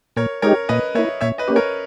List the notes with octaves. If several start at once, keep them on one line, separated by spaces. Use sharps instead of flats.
A#2 A#4 C#5
G#3 D#4 G4 A#4 C#5
A#2 B4 D#5
A#3 E4 C#5 E5
A#2 C#5 E5
B4 D#5
A#3 C#4 G4
A#4 C#5